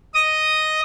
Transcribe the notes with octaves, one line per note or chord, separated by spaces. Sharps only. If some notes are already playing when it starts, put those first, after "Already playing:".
D#5 D#6